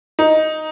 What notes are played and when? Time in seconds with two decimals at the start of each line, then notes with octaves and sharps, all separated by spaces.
0.19 D#4